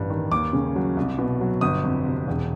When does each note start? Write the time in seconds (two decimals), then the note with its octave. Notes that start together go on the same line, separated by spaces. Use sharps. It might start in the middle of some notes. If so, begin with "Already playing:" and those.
Already playing: A1 G2
0.10 D#3
0.31 D#2 D6
0.53 C#3
0.76 F#3
0.97 C2
1.19 B2
1.41 F#3
1.61 G1 D#6
1.84 F2
2.05 C3
2.28 E1